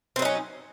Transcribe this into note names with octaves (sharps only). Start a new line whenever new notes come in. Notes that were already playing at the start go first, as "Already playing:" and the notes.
F#3 C4 C#4 D#4